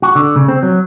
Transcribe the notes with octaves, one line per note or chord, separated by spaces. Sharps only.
F#4
D3
C#3
C4
F#3